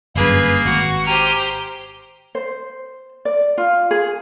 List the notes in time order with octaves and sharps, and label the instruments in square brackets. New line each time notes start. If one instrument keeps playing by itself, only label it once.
[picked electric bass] G1 F#2 [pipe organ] A#3 [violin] G#4 B4
[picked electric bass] G#1 [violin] F#4
[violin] G4 C5 [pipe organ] G#5 A#5 F6
[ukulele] C5
D5
F4
G#4